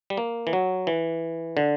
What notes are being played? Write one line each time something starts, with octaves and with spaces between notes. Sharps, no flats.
G3
A#3
E3
F#3
E3
D3